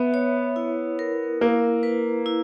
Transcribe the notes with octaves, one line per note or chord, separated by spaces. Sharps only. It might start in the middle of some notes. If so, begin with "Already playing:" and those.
Already playing: B3 E5
C#5
E4
A#4
A#3 E4
B4
E4